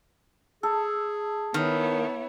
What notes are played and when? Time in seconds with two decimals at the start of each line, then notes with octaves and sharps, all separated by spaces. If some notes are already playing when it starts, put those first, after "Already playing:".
0.63 G#4 A4
1.54 D#3 B3 E4 C#5